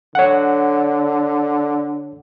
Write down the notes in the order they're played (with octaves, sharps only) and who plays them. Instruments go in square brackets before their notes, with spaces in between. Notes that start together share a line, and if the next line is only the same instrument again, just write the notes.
[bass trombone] D3 [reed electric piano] C#5 F#5